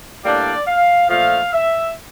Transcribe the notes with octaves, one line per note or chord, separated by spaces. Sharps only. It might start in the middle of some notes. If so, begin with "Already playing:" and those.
A2 G3 A#3 D4 D5
F5
A#2 F3 A3 F5
E5